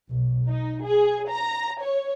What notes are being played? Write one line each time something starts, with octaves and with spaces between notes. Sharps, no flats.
B1
D#4
G#4
A#5
C#5